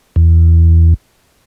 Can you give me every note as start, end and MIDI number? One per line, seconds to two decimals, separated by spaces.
0.16 0.94 40